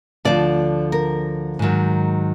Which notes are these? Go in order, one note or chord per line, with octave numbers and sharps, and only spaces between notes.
D2 D3 F3 D5
A#4
G#2 D#3 F#3